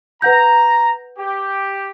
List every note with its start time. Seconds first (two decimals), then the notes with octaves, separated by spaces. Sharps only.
0.22 B4 F#5 A#5 G6
1.18 G4